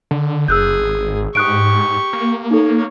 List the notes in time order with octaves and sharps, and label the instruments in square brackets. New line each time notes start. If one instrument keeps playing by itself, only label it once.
[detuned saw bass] D3
[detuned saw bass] F#1 [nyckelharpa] G#4 [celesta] E6 F#6 G6
[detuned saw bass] G#1
[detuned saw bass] G#2 [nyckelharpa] G4 C#6 [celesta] D#6 F#6 D7
[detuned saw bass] A#3
[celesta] D#4 A4 [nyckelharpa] C#5